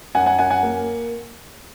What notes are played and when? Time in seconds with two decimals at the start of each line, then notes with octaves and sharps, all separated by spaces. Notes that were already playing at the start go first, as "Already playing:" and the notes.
0.15 F#2 F#5 G#5
0.26 F#5 G#5
0.39 F#2 F#5 G#5
0.50 F#5 G#5
0.63 A#3